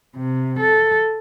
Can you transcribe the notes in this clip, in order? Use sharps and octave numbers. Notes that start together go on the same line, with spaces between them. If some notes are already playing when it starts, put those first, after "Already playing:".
C3
A4